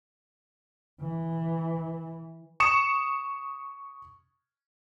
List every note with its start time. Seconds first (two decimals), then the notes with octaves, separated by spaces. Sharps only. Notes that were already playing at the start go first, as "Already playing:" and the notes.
1.01 E3
2.60 C#6 D#6 C#7 E7